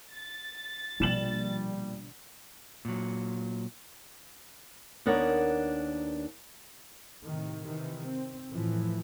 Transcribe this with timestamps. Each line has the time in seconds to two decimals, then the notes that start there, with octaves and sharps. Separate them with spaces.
0.12 A6
1.00 A#1 B2 D3 G3 E7 F#7
2.85 A#2 F#3
5.06 D#2 B3 D4 A#4 C#5 F#5
7.24 A2 C3 D#3
7.63 C3 D#3 E3
8.06 C4
8.50 F2 A2 E3 F3